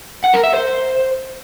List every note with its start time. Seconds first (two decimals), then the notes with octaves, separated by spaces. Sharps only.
0.24 F#5
0.34 A#4
0.44 E5
0.53 C5